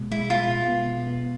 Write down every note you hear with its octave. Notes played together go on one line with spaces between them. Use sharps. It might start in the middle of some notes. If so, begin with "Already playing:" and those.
Already playing: B2 G#3
G#3 E4
G#3 F4
B2
B3
B2
B3